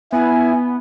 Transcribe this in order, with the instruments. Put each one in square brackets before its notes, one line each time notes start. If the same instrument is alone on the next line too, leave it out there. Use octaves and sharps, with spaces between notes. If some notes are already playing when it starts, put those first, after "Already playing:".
[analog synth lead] B3 [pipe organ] E4 [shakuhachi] G#5